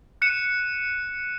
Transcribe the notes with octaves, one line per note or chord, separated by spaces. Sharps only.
F#6 C#7 D#7 E7